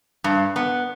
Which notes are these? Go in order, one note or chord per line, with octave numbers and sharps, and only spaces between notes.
G2
B3